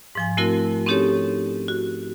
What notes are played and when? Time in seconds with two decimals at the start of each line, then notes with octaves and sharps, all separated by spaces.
0.15 G#2 F3 G#5
0.37 A3 C4 E4 F#4 A#4
0.86 C4 C#4 D#4 G4 A4 C#5
1.68 F#4